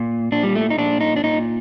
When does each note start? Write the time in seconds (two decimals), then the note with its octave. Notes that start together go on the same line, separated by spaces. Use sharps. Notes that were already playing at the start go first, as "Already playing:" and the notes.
Already playing: A#2
0.32 A#2 D4
0.43 G3
0.55 A3
0.70 D#4
0.78 A#2 D4
1.01 D#4
1.16 D4
1.24 A#2 D#4